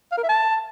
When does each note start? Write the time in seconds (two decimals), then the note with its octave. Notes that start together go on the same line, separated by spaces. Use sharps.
0.12 F5
0.18 A#4
0.23 E5
0.29 A5